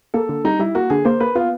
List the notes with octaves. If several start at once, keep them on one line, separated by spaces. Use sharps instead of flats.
A#3 A4
D3
G3 D#4
G3 E4
A#3 F#4
D3 G#4
A#3 C5
A#3 B4
B3 F4